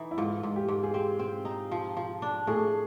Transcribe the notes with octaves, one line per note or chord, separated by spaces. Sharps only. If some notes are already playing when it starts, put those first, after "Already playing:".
Already playing: E3 D#4
E4
G#2 F4
G#2
G4
G#2
G#4
C4 G4
C4
D#4
F3
F3
D4
A2 G#4